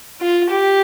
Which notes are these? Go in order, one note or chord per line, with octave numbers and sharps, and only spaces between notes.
F4
G4